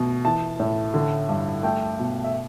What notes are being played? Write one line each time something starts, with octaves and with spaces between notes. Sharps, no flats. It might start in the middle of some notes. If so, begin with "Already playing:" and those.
Already playing: B2 A3
E3 A5
A2
D3
G2
A3 G5
B2
E5